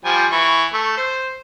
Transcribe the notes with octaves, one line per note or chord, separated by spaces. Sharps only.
F3 G3 G#5
E3 C#6
A3
C5